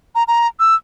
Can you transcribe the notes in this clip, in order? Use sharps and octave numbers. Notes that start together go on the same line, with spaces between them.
A#5
A#5
E6